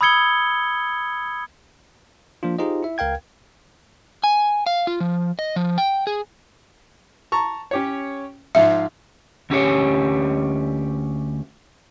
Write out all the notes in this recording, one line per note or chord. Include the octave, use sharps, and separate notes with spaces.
B5 D#6 E6 G#6 C#7 G7
F3 A#3 D4 F4
D#4 F4 G4 G#4 C5 D#5
E4 E5
C#2 A#4 F5 G5 G#6
G#5
F5
F4
F3
D#5
F3
G5
G#4
A5 A#5 C#6
C#4 G4 C#5
G#2 F3 E5 F5
D2 C#4 G4 C#5